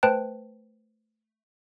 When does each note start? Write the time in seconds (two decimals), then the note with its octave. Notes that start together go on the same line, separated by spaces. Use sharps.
0.03 A3 B4 C5 G5 A5 F#6